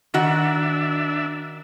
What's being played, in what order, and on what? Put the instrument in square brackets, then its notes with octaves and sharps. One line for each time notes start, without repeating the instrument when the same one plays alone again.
[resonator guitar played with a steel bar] D#3 F#4 [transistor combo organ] D4 E5